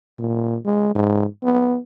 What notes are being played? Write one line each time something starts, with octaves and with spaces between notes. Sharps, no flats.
A#2
G#3
G#2
B3